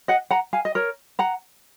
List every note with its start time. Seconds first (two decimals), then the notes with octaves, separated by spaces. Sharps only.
0.08 D#5 F#5
0.31 F#5 A#5
0.53 F5 G#5
0.65 D#5
0.75 A#4 C#5
1.19 F#5 A#5